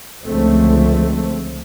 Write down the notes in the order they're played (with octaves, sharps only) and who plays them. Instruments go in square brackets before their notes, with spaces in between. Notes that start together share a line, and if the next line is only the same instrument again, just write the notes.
[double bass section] C#2 D3 F3 A3 C4